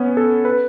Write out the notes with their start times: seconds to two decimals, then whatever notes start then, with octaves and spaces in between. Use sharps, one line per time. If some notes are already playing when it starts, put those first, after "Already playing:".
Already playing: B3 C#4
0.17 A4
0.45 B4